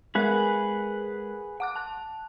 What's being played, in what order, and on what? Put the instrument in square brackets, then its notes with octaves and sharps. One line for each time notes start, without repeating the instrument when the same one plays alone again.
[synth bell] G#3 A#4 F#6 [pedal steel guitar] G#4 B4 F#5
[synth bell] F#5 D6 F#6
A5 F#6